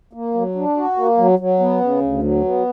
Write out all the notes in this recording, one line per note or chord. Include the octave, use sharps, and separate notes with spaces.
A#3
F#3
D4
F#4
A#3
F#3
F#3
B3
C#3
D2
F#3
B3